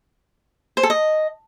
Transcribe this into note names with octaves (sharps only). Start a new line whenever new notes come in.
C5
A4
D#5